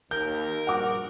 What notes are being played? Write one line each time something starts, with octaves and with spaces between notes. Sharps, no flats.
D#2 A#4 G6
A#1 G2 F#4 F#5 D6